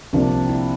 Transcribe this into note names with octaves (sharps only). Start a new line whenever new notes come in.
C2 C3 F3 A#3 D4
C4
E4